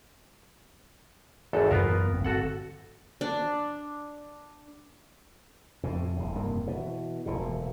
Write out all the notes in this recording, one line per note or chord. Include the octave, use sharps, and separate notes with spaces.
G#1 E2 A4
F#2 E3 B3 F4 A#4
D1 G1 C4
F#4 A4 F#5
D4
F2 A2 C3
D#1 C3
F1 G2 C3 A#3
B2 E3
E1 D2 A#2